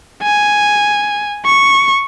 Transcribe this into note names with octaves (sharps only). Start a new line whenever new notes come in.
G#5
C#6